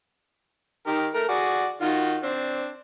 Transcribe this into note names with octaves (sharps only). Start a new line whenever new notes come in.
D#3 G4 A#4
A3 A#4
F#4 G#4 D5
D#3 F4 F#4
C4 D4